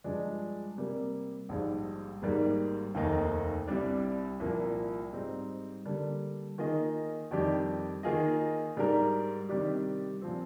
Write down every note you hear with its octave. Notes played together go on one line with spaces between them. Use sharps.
G2 F3 G#3 D4
C3 G3 A#3
A#1 G#2 G3
G#1 G#2 G3 A#3
F1 D#2 D#3 A#3 D#4
C2 C3 G3 D4
C2 A#2 F3 A#3
G#2 G3 C4 D#4
D3 G3 A#3
D#3 A#3 F4 G#4 D#5
F2 D#3 G3 D4 G4
D#3 A#3 F4 G#4 D#5
G#2 G3 D4 G4 A#4
C3 D#3 G3 D4 G4
A#2 F3 C4